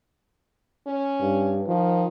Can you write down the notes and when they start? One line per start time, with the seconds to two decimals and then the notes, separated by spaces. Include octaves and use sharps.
0.87 C#4
1.20 G2
1.67 D#3 F3